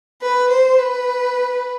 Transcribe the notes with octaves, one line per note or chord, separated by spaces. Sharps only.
B4
C5
B4